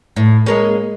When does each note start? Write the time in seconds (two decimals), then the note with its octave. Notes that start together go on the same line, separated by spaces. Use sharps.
0.16 A2
0.46 G#3 A#3 C#4